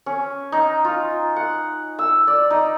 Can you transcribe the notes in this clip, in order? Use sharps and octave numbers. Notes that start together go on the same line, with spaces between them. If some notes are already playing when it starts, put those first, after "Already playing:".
C#4
D#4
F4
F#5
E6
D5
D#4